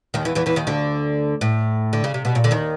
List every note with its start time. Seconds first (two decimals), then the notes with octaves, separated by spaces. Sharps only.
0.14 D#2 D#3
0.25 E2 E3
0.35 E2 E3
0.46 E2 E3
0.56 D#2 D#3
0.67 D2 D3
1.41 A2
1.93 D3
2.04 C#3
2.14 C3
2.25 B2
2.35 A#2
2.44 D3
2.51 D#2 D#3